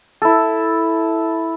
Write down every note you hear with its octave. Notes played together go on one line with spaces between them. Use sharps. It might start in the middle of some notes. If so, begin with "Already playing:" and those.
E4 A4